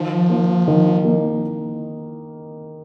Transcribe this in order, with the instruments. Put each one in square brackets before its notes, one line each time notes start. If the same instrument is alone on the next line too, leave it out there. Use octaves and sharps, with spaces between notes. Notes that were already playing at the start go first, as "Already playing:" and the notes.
Already playing: [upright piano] D#3 [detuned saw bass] F3
[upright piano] A#3 D#4
D#3
A#3 D#4